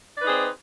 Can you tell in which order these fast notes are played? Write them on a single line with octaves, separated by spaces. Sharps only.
D5 B4 D#4 G#4 C4